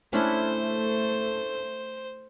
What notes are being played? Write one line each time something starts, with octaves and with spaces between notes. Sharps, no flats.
A3 C#4 D4 E4 C5